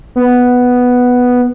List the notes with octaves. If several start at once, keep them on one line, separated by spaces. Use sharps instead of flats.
B3